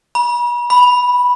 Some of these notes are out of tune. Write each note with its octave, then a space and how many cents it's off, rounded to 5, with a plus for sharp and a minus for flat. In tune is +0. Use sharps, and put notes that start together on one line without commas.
B5 -40
B5 -5